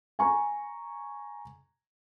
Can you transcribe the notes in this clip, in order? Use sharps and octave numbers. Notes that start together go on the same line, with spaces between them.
G#5 A#5 C#6